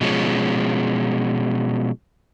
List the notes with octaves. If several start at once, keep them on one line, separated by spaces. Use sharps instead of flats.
B2 F3 G#3 C#4